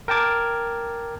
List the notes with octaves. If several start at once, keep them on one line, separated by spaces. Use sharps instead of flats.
A#4 G5 A5 D6 G#6